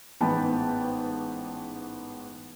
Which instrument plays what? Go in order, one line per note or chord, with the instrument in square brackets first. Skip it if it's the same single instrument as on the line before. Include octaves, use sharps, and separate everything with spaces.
[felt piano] A1 G#2 B3 G5 A5 B5